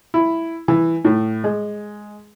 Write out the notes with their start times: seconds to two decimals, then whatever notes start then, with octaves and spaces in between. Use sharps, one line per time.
0.14 E4
0.68 E3
1.05 A2
1.44 G#3